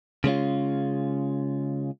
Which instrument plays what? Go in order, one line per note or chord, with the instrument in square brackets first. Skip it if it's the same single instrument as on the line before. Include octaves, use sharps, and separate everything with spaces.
[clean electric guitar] C#3 G#3 C#4 F4